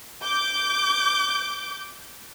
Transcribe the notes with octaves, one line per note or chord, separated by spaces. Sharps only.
D6 G6